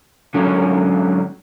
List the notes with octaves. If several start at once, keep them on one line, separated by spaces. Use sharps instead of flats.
G#2 D3 F#3 C#4